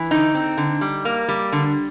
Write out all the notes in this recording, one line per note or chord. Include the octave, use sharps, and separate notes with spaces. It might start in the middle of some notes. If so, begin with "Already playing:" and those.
Already playing: E3
D3 D#4
C4
D3
G3
A#3
G3
D3